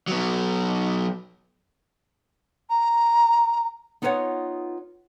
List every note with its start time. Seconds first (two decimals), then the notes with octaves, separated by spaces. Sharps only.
0.08 F#3 B3
2.70 A#5
4.02 B3 D#4 F4 B4 C#5 F#5